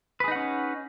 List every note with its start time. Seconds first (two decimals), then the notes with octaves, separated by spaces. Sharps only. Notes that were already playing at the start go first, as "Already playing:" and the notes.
0.20 B4
0.24 G#4
0.28 D#4
0.32 F#5
0.35 C#4